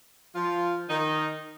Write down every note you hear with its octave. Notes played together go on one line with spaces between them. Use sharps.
F3 F4
D#3 D#4